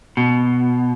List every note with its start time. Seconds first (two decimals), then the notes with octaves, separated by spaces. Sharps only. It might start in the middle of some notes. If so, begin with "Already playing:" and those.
0.17 B2